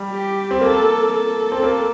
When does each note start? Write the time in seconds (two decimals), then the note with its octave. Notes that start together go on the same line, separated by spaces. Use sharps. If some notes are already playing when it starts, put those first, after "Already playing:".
Already playing: G3
0.10 G4
0.51 C4
0.61 A#3 A4
1.13 A4
1.52 C4
1.63 A#3